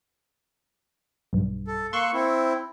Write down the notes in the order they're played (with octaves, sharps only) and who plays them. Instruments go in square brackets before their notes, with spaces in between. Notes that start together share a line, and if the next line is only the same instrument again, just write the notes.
[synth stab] B1 G2
[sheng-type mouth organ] A4
[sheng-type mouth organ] A#3 E6 F#6 [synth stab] C6 C#6
[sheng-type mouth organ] C4 E4